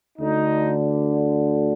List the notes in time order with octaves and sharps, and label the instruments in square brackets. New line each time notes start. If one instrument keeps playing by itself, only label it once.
[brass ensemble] D2 D3 D#4